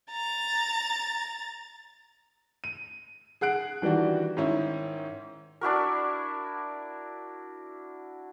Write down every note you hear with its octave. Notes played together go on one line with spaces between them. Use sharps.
A#5 A6
D#7
G#4 F#5 F#6 D7
D#3 E3 G3 D4 F#4
G#2 D#3 C#4 E4
D4 E4 F#4 A#4